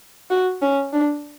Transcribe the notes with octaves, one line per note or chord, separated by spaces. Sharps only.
F#4
C#4
D4